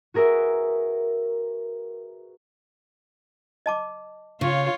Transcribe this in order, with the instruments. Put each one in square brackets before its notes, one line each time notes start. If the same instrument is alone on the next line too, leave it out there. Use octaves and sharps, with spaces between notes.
[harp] F#4 G#4 A#4 B4 E5
[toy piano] D#5 A5 D6
[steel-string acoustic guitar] C#3 [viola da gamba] F4 C#5